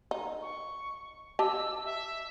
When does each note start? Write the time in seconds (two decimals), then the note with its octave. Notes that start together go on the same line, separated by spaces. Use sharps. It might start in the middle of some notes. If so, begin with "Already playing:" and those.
0.11 D#4
0.42 C#6
1.39 G4 D#5 A5 E6
1.85 E5